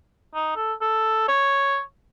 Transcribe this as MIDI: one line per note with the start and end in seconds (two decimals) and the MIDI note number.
0.35 0.53 63
0.56 0.74 69
0.81 1.26 69
1.29 1.81 73